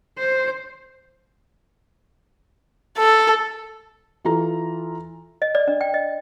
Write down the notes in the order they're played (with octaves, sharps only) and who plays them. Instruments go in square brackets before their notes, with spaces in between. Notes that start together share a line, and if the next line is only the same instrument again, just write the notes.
[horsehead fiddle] C5
[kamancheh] A4
[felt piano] E3 F4 A4 A#5
[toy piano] D#5
D5
D4
G5
D#5